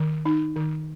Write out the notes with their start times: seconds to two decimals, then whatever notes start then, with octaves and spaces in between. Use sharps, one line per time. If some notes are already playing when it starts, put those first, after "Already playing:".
Already playing: D#3
0.25 D#4
0.56 D#3